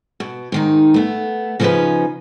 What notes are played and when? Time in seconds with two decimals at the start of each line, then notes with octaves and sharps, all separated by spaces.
0.20 B2
0.52 G#2 D#3 D#4
0.94 A3 B3
1.60 C#3 F3 B3 C#4 D#4 B4